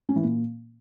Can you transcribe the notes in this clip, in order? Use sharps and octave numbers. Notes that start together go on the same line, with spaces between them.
C#4
E3
A#2